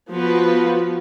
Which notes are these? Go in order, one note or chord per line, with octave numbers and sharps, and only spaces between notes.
F3 B3 F#4 B4